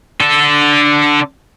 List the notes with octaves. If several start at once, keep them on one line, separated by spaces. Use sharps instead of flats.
D3 A4